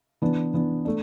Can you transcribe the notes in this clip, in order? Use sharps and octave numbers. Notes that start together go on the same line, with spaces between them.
E3 B3 D4
E3 B3 D4
A3 D4